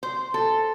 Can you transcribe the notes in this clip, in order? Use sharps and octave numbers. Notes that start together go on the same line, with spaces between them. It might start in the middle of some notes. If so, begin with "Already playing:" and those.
C5
A4